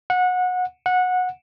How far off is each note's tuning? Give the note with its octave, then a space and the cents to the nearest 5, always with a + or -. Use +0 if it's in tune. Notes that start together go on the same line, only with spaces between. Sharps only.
F#5 -25
F#5 -20